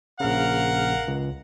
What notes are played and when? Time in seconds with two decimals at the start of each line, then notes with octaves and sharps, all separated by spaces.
0.20 A#1 C#3 A#4 F5 F#5
1.08 C#2